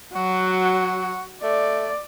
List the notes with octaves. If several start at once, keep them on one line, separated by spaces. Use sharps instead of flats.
F#3 F#4
A3 D5